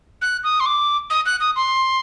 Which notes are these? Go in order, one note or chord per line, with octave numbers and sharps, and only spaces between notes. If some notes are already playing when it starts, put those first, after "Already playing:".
F#6
D#6
C6
D6
D#6
F#6
D#6
C6